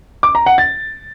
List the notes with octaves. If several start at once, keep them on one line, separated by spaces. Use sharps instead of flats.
D6
A#5
F#5
A6